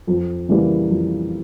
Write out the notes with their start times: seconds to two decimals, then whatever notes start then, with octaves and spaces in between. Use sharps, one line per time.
0.07 F2
0.48 C#3 E3 G3 A#3
0.90 F2